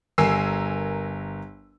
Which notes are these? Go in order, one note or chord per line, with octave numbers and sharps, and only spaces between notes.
G1 A#4 G#5 E6 C7